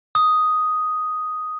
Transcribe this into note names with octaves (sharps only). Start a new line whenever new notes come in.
D#6